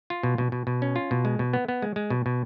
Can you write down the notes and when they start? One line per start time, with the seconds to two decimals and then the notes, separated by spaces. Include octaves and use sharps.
0.10 F4
0.23 B2
0.38 B2
0.52 B2
0.67 B2
0.82 C#4
0.96 F4
1.11 B2
1.25 G#3
1.39 B2
1.53 B3
1.68 B3
1.82 G#3
1.96 G#3
2.10 B2
2.26 B2